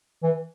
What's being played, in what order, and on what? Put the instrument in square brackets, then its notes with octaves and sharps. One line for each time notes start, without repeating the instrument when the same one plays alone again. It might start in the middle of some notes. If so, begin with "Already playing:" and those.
[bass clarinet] E3